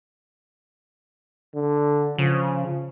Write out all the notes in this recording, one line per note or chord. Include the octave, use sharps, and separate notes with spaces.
D3
C#3 F3